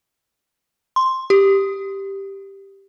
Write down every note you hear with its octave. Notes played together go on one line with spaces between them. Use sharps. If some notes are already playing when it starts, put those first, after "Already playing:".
C6
G4